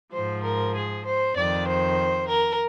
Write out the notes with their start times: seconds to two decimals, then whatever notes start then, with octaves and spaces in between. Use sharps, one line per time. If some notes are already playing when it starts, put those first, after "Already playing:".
0.12 G#2 F3 C5
0.44 A#4
0.75 G#4
1.05 C5
1.36 F2 D#3 D5
1.68 C5
2.29 A#4